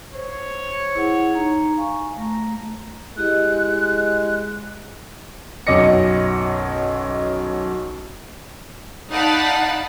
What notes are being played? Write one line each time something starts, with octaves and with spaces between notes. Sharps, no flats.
C5 C#5
E4 G#4 F#5
D#4 A#5
F5 G#5 C#6
A3 A#5
G#3 E4 G4 D#5 F#6
B1 F#2 D#5 D6 A#6 C#7
D#4 D5 F5 F#5 A5 B5